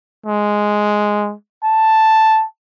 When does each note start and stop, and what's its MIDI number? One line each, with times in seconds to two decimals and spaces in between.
0.26 1.34 56
1.64 2.45 81